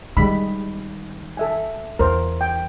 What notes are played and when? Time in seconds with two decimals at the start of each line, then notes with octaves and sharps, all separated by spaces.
0.17 D#3 G3 G#3 B5
1.37 A4 E5 G#5
1.99 E2 A#4 C5
2.41 G5